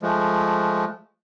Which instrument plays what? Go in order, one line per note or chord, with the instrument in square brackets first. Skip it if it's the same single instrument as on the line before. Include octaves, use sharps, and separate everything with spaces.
[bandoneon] F3 G#3 A3